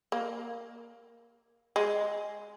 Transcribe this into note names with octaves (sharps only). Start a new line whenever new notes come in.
A#3
G#3